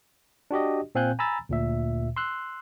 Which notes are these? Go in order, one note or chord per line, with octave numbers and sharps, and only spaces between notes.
D4 F#4 G4 D#5
A#2 C4 F5 G#5 F#6 G6
G#5 A#5 B5 E6 A6
D2 A#2 E5
C6 E6 F#6